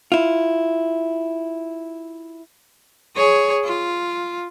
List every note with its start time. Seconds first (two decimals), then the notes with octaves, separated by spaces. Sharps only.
0.12 E4 F4
3.16 G#4 C#5
3.65 F4